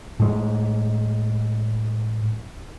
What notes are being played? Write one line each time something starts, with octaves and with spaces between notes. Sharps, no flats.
A2 G#3